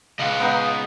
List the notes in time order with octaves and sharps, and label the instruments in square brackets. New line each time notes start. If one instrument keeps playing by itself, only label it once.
[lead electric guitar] C#2 [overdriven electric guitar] D#5 F#5 [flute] F5
[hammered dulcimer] B3 D#4